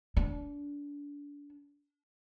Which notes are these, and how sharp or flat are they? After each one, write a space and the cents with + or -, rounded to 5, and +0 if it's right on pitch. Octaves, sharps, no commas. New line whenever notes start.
D4 -30